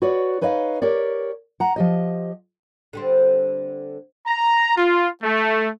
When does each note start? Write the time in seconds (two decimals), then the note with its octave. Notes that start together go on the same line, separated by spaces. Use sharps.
0.02 F#4 B4 C#5 D5
0.41 D#4 B4 C#5 D#5 F5
0.82 G4 A#4 C#5 D5
1.60 F#5 A#5
1.76 F3 G4 D#5
2.93 D3 G3 C4
4.26 A#5
4.77 F4
5.23 A3